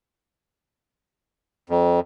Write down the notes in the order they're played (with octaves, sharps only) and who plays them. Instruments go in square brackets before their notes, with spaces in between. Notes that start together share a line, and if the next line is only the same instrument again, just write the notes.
[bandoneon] F2